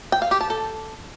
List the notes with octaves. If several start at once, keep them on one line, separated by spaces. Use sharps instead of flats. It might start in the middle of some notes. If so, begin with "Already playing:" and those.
G5
F5
G4
A5
A4